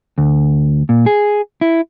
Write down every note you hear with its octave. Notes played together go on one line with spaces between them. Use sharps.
D2
A#2
G#4
E4